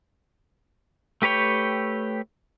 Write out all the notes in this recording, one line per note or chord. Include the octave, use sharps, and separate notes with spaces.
A3 G4 B4 C#5 G5